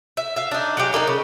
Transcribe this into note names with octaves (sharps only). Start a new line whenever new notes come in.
E5
E5 F5
D4 D#4
F#3 G#3 C#4 G4
A3 A#3 D4 D#4
C#3